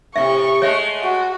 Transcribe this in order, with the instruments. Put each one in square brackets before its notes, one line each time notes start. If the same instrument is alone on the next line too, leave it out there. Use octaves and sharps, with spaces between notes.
[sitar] A2 C3 [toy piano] E5 [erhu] C#6
[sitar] G#3 A3 [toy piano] C#5 E5
[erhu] F#4